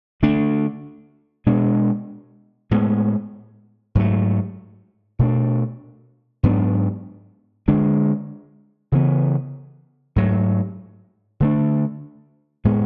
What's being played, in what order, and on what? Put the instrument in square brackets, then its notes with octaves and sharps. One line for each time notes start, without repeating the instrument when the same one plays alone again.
[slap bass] D3 A3 D4
B2 G#3 B3 D4
A2 G#3 B3
G#2 F#3 A3
B2 A3 D4
G#2 F#3 B3 D4
D3 G#3 D4
C#3 E3 B3
G#2 F#3 A3
D3 A3 D4
A2 G#3 B3